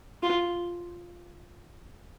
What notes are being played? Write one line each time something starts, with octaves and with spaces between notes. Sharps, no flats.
F4